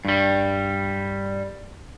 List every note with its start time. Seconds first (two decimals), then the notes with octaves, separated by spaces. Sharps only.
0.05 G2 G3